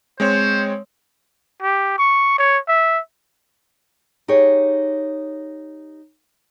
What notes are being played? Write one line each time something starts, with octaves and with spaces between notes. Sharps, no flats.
G#3 C4 C5 C#5
G4
C#6
C#5
E5
D#4 G4 G#4 C#5